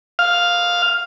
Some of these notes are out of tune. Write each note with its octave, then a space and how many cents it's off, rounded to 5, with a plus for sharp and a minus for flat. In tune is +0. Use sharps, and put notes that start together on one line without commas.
F5 +5